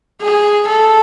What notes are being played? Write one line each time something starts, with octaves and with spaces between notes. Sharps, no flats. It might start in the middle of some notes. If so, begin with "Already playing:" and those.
G#4
A4